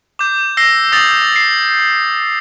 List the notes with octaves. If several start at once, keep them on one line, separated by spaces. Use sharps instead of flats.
D6 G6
E6 A#6 C7
D#6 E6 G6 A6 A#6 F7
C7